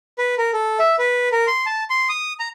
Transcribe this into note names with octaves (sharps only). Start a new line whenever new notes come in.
B4
A#4
A4
E5
B4
A#4
C6
A5
C6
D#6
A#5